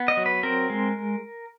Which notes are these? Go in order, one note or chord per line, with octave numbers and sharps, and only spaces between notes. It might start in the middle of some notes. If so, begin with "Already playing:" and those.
Already playing: B3
D#5
F#3
B4
C4 A#4
G#3